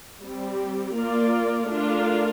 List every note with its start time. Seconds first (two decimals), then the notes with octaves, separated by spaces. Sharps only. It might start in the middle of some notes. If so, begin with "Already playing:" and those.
0.24 G3 C4 G4
0.96 A#3 F4 A#4 D5
1.69 A3 D4 F4 A#4